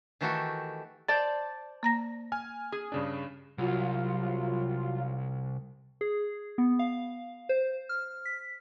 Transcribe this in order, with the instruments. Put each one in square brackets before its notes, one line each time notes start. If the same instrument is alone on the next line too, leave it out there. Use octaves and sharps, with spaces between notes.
[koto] D#3 E3 A3 F#4 G4 A4
[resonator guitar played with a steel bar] C5 D5 A5 [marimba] A6
[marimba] A#3 A#5 A#6
[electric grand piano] G#5 F6
[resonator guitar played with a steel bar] G#4
[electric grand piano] G2 C#3 D4
[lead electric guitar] C2 [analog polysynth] F#3 F4
[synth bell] G#4
B3
F5
C5
F6
B6